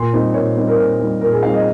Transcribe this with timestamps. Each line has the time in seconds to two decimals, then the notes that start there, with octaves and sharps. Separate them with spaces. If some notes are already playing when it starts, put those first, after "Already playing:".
Already playing: A#2 C6
0.13 G3 C4 D#4
0.34 A#2 C#5
0.56 G3 C4 D#4
0.68 A#4
0.78 A#2 C5
0.99 G3 C4 D#4
1.21 A#2 A#4
1.32 G#4
1.43 G3 C4 D#4 F5
1.54 D#5